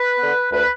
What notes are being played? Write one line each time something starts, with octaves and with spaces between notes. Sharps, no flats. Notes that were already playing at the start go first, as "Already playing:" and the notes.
Already playing: B4
D3 B3
D2 B4